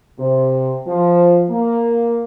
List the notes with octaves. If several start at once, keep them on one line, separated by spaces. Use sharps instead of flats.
C3
F3
A#3